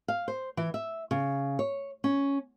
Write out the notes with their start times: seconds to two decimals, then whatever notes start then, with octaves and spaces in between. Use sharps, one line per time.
0.08 F5
0.28 C5
0.57 E3
0.74 E5
1.11 C#3
1.59 C#5
2.04 C#4